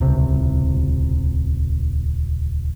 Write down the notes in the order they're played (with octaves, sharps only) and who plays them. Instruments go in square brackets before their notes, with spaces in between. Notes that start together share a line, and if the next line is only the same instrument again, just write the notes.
[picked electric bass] D#1 C#2 C3